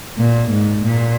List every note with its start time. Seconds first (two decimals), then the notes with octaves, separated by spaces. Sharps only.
0.18 A#2
0.51 G#2
0.85 A#2